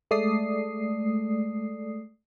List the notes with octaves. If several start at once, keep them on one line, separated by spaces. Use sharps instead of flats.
G#3 A3 A4 D5 D#6 C7